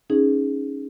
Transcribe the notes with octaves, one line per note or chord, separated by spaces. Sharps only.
C#4 D#4 G#4